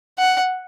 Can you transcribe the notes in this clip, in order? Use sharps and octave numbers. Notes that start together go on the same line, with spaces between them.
F#5